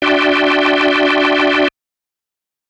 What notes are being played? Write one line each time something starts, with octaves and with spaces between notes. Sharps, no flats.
D4 F#4 D5 E5 G5 C6